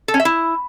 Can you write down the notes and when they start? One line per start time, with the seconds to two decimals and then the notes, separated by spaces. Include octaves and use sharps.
0.08 A4
0.14 C#4
0.20 E5
0.25 E4